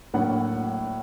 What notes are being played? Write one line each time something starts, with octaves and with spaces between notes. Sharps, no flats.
A2 F#3 A#3 D4 F#5